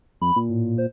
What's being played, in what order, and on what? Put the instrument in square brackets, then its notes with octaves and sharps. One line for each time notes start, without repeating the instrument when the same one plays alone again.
[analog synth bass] F2 [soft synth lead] B5
[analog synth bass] A#2
[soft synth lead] A2
C5